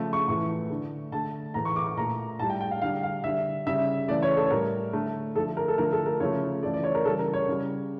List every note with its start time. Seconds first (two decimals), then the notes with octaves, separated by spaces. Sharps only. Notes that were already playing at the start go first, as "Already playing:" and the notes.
Already playing: C#3 F3 A3
0.13 C#6
0.28 A2 E3 A3 C#6
0.70 D3 A3
1.12 D3 A3 A5
1.54 A2 E3 A3 A#5
1.65 C#6
1.76 D6
1.87 C#6
1.97 A#2 A3 A#5
2.39 A2 G3 A5
2.50 G5
2.61 G5
2.71 F5
2.82 D3 G3 F5
3.03 F5
3.24 D3 G3 E5
3.67 C#3 G3 E5
4.08 C#3 E3 A3 D5
4.22 C#5
4.37 A4
4.46 C#5
4.51 A2 G3 A#4
4.93 D3 A3
5.35 D3 F3 A3 A4
5.57 A#4
5.68 A4
5.78 D3 F3 A3 A#4
5.93 A4
6.06 A#4
6.20 C#3 F3 A3 C#5
6.63 C#3 E3 A3 D5
6.74 D5
6.84 C#5
6.95 A#4
7.05 C#3 E3 G3 A4
7.19 A#4
7.34 C#5
7.48 C#3 G3